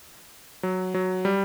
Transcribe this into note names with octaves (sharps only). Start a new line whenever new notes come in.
F#3
F#3
G3